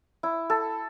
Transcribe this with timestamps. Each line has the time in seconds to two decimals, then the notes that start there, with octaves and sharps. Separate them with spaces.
0.23 E4
0.50 A4